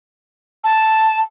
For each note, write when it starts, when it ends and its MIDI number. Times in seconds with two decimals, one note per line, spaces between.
0.64 1.21 81